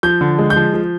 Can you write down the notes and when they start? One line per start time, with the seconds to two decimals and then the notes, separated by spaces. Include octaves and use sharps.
0.03 F3 G6
0.21 D3
0.39 G#3
0.50 G6
0.56 F3
0.74 F3